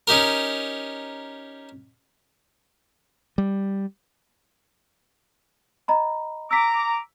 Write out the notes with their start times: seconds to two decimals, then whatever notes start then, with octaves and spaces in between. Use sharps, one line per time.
0.07 C#4 D#4 G4 A#4
3.38 G3
5.88 D#5 A#5 B5
6.51 A#5 D6 E6 B6